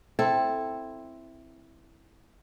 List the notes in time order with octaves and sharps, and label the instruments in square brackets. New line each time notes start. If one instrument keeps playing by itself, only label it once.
[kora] C4 E4 A4